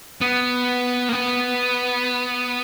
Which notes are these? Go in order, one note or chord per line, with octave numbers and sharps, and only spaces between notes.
B3
A#3
B3